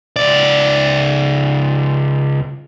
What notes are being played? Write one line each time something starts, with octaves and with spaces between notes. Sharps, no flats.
C#2 D5